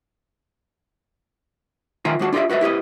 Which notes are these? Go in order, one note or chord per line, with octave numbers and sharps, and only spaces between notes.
D#3 F4 E5 G5 G#5 A#5
D#2 G#3 F#4 A5
D4 F4 G4 D#5 E5
F#4 B4 D#5 E5
E4 G4 B4 D#5